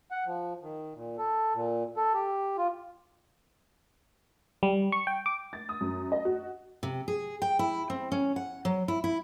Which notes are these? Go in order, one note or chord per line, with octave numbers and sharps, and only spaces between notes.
F#5
F3
D#3
A#2
A4
A#2
A4
G4
F4
G3
C#6
G5
D6
A6
D#6
F#2
D#5
F#4
C3
G#4
G5
E4
C4
C#4
F#5
F#3
E4
E4